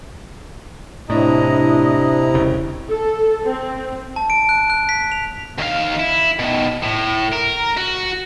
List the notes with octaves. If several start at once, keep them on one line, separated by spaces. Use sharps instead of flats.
A2 C3 D4 E4 D#5 A#5
E1 C#3
A4
C4
A5
D7
F#6
F#6
B6
F7
D#2 F5
E4
B2 D#3
A2
A#4
F#4